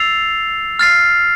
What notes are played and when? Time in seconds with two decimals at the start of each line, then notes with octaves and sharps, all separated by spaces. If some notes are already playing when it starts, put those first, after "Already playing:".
Already playing: E6 A6 C7 F7
0.79 F6 A6 C7